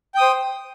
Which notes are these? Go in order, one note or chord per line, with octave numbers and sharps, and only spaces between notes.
C5 G5 D#6